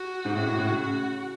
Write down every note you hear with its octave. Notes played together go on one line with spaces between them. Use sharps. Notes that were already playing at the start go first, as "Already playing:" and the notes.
Already playing: F#4
G#2
A2 F#4
A2
A2
C#3
F#4